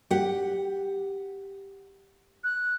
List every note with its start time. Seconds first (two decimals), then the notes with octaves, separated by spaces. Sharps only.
0.10 G4 F#5
2.44 F#6